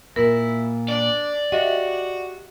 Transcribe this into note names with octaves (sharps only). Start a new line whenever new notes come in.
A#2 A#3 E4 A#4
D4 D5
F#4 G4 D#5 E5